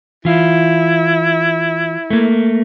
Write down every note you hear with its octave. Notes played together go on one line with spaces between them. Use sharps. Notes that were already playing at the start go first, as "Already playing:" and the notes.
E3 E4 F4
A3 A#3